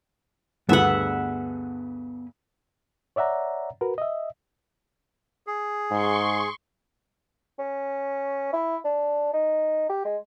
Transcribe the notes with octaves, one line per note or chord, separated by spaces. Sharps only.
D2 G2 D3 B3 G#4 B4 E5 F#5
C#5 D5 E5 F#5 A#5
F#4 A#4 B4
D#5 E5
G#4
G#2 C6 C#6
C#4
E4
D4
D#4
G4
G#3